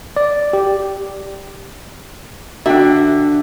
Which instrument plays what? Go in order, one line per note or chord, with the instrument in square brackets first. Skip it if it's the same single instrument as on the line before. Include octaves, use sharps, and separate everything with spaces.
[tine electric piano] D5
G4
[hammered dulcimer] D3 [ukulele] D4 F#4 [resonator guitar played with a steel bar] E5 G5